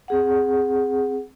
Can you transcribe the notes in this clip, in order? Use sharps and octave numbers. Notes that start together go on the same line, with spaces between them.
C4 G#4 F#5